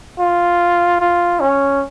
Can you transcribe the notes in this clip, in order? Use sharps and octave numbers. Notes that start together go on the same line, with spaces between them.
F4
F4
C#4